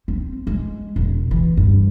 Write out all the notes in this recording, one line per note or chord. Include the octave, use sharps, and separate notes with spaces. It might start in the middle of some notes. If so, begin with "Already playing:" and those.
C4
G#3
E1
E3
G2